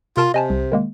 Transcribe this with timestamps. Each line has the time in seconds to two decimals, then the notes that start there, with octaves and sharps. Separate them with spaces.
0.17 C3 F4 A#4 A5
0.34 C3 D#5 G#5 A5
0.50 C2
0.72 D#3 G#3 A#3